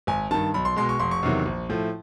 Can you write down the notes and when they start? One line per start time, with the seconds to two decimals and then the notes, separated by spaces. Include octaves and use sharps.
0.07 G#1 G#5
0.31 G2 D#3 A5
0.54 B1 B5
0.65 C6
0.76 B2 G#3 C6
0.89 C#6
0.99 F1 C6
1.11 C#6
1.23 E2 C3 D#3 F#3
1.46 A#1
1.69 A2 F3 A3